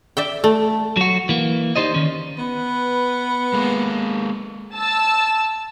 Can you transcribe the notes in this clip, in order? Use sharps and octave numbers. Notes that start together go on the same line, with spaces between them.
D5 E5 G5
A3
F#3 F#4
E3 A#3
D#4 G4 C5 D5 D#5
D#3 C#4
B3 B4
G#3 A#3
A5 E6